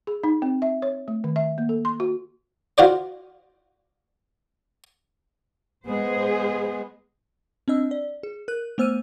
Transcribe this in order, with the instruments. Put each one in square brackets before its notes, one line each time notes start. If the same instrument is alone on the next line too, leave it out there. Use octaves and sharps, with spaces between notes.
[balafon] G#4
D#4
C4
E5
C#5
A3
D#3
E5
A#3
A4
C6
F#4
[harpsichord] F4 F#4 C5 D5
[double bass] G#3 B3 [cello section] G#4 C5
[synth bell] C4 D4 D#5 E6
D5
G#4
A#4 F#6
A3 B3 C5 E6 F6 D#7